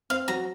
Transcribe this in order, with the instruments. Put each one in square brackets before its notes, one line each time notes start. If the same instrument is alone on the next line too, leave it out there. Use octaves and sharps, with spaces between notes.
[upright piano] C4 [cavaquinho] F5
[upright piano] F#3 [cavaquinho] A#5